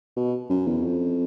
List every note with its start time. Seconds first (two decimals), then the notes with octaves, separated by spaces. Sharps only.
0.16 B2
0.50 F#2
0.67 E2
0.84 F2